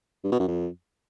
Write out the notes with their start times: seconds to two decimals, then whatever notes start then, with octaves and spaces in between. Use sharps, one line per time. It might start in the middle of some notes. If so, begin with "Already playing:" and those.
0.24 G2
0.32 B2
0.40 F#2
0.48 F2